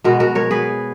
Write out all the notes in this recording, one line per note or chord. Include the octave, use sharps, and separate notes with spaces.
B2 G#3 B3 F#4 A#4
F#4 A#4
A#4 C#5
G#4 B4